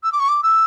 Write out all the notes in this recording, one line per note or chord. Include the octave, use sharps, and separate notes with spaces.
E6
D6
C#6
D6
E6